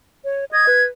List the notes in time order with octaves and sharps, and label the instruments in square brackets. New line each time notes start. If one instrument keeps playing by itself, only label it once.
[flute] C#5
[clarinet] D#5 [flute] G#6
[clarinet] B4